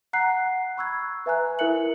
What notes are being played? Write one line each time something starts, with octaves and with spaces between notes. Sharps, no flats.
F#5 A#5 F#6 C7
B5 C#6 E6 F#6 G#6
B4 E5 G#5 A#5 F#6
E4 A#4 E5 F#6 C#7 F#7